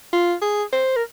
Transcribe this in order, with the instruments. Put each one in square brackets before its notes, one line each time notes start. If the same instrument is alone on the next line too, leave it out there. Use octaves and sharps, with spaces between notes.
[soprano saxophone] F4
G#4
C5
A#4